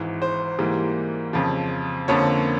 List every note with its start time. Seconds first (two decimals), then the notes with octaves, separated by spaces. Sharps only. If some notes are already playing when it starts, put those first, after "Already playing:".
Already playing: G#1 G#2 E3
0.22 C5
0.59 G#2 E3 G3 A#3
1.33 F2 C#3 F3
2.08 F2 D3 F3 A#3 C#4 C#5